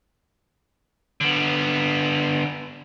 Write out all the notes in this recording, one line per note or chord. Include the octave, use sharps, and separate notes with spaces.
D3 B3